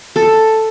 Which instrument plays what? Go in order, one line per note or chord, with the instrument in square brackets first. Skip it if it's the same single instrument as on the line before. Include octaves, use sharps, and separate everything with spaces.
[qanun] A4